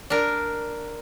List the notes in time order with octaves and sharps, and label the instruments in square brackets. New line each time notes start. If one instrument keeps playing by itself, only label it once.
[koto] D4 A#4